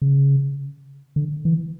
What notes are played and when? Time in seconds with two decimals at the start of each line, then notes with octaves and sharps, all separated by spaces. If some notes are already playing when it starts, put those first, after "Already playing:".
0.02 C#3
1.16 D3
1.45 E3